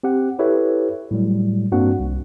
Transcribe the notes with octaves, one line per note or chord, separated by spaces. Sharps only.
C4 G4 F#5
E4 G4 A4 B4 C#5 E5
A2 F#3 G3
G2 A#3 C4 D4 F#4 F#5
C2